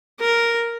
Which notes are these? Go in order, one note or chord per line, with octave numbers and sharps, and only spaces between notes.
A#4